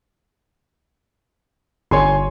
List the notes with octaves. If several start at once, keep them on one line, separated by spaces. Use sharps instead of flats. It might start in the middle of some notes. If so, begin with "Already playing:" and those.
G1 C#5 G#5 C6